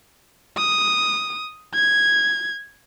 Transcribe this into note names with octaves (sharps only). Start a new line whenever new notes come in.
D#6
G#6